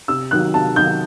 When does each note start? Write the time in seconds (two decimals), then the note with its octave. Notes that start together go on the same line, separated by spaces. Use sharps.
0.08 C3 E6
0.31 D#3 F#3 F#6
0.54 C3 A5
0.76 D#3 F#3 G6